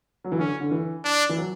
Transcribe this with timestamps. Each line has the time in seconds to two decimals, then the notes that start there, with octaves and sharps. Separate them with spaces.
0.24 F#3
0.32 E3
0.38 D3 C#4
0.60 D3
0.71 E3
1.04 D4
1.29 E3
1.37 F#3